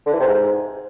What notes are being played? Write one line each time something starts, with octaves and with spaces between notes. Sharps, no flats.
D3
E3
C3
G#2